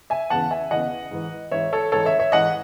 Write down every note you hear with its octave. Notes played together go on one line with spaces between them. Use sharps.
E5 G#5
E2 C#3 E3 F#5 A5
E5 G#5
E2 C#3 E3 D#5 F#5
G#2 E3
G#2 E3 C#5 E5
A4 C#5
G#2 E3 A4 C#5
C#5 E5
C#5 E5
G#2 E3 D#5 F#5